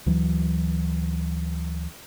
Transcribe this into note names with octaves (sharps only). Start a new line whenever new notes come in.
D2 E3 F#3